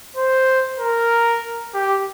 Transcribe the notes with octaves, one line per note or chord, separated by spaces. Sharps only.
C5
A#4
G4